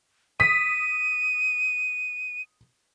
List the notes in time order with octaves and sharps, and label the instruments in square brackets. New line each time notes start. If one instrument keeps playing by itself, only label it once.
[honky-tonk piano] D#6 B6 [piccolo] D#7